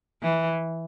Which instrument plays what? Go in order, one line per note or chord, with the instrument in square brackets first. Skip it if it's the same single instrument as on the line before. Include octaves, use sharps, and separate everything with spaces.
[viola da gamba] E3